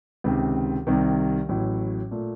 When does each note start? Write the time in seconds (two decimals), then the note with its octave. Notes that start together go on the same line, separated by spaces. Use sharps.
0.24 C#2 C3 D#3
0.87 C2 C3 D#3
1.49 A1 A2 F#3
2.11 A#2 A3